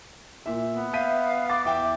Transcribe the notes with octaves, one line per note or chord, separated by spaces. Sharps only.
A#2 E5
B3
E5 F5 G6 B6 D#7
D6 A6
E2 E5 G5 D6